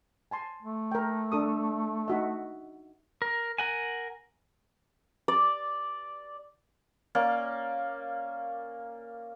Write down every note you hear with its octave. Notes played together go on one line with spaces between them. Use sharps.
G#5 A5 C6
A3
A#4 G5
D4 A4 D#6
D#4 F#4 E5
A#4
A#4 F#5 G#5
D5
A#3 C#4 D5